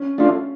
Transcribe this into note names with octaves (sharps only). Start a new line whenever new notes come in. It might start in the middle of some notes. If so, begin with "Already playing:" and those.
Already playing: C#4
A3 D4 F4